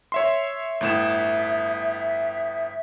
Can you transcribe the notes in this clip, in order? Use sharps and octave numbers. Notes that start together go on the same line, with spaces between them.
C#5 E5 C6
G1 A2 E5 E7